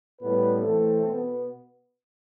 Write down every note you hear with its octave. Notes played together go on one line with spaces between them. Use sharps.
A2 G3 B3 B4
E3 A3 C4 A4
B2 B3